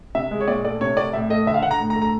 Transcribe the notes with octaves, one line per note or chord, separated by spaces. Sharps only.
C3 E5
G#3
C#5
A#2 D5
A3 D5
C3 C#5
A3 D5
A2 E5
A3 D#5
D3 E5
F5
D3 F#5
A#5
A2
A#5
A3
A#5